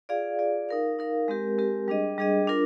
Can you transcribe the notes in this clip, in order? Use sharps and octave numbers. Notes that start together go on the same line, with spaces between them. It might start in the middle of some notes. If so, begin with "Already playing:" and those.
F4 G#4 D5 F5
F4 G#4 D5 F5
D#4 A#4 F5
D#4 A#4 F5
G#3 C4 G4 A#4
G#3 C4 G4 A#4
G3 D4 G#4 D#5
G3 D4 G#4 D#5
D4 F4 A#4